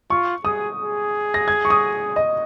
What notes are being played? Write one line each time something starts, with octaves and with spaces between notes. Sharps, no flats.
F4 C#6
G#4 D#6
G#4
A#6
G#6
C#6
D#6
D#5